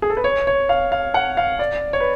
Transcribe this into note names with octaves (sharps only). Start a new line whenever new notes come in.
G#4
A4
B4
C#5
C#5
F5
F5
F#5
F5
D5
C#5
B4